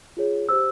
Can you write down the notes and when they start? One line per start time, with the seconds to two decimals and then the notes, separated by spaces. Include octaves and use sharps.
0.17 F4 G#4 C#5
0.49 G4 C5 E6